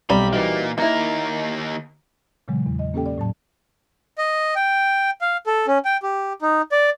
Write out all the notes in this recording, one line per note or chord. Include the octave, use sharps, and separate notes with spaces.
B1 G3 C4 A#5 B5
A#2 E3 A#3 D#4 F#4
D#2 A#3 D#4 E4 A#4
A#2 C#3 E3 F#3 G#3
E2
D#5
A#3 C#4 G4 A4 G5
D5
A2 F#3 A5
D#5
G5
F5
A4
C#4
G5
G4
D#4
D5